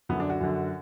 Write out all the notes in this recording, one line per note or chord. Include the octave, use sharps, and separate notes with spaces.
F#2 D3 B3
D4
F#4
F#2 D3